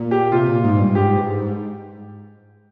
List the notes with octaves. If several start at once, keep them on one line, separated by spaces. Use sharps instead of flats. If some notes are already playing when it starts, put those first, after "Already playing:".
Already playing: A#2
G4
C3 F4
A#2
G#2
G2
G#2 G4
G2
G#2